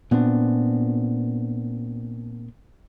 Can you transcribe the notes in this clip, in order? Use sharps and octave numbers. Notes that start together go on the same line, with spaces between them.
A#2 B3 C4 D4